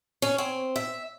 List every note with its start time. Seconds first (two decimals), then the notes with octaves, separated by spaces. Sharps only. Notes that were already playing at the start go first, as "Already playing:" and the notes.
0.22 C#4
0.38 C4
0.76 E5